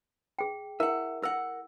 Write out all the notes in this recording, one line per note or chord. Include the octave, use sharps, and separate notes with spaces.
G#4 G5
E4 A#4 E5 F#5
A#4 F#5 E6